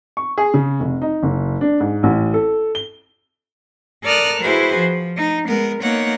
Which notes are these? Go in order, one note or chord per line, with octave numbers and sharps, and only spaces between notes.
C#6
G#4
C#3
F1
D#4
F#1
D4
G#2
A1
A4
G7
A4 A#4 D5 D#6 F6 F#6
E4 F#4 G#4 B4 C5
F3
D#4
G#3 B3 A#4
A#3 B3 D#4 C#5 F#5